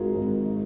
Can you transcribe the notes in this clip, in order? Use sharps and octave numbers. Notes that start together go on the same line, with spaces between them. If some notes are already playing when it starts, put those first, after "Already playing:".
Already playing: G#1 G#2 F4 F#4 G#4 A#4
G#1